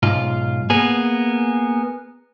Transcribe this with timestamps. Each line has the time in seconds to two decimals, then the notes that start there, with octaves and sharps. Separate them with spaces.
0.03 B1 G#2 F4
0.70 A#3 B3 G#4